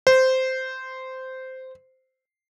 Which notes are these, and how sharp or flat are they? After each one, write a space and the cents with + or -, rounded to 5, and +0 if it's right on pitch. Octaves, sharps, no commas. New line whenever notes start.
C5 -10